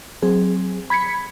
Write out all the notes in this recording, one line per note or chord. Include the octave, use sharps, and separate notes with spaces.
F#3 C4 G#4
B5 G#6 B6 C#7